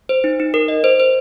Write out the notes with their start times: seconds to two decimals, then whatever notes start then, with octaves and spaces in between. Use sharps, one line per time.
0.09 C5
0.24 D#4
0.40 D#4
0.54 A#4
0.68 D#5
0.84 C5
1.00 C5